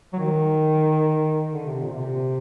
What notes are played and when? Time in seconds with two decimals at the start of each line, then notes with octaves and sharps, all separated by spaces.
0.13 F#3
0.19 D#3
1.53 D3
1.66 C3
1.80 A#2
1.93 C3